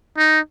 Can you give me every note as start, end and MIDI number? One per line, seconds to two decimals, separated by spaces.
0.17 0.40 63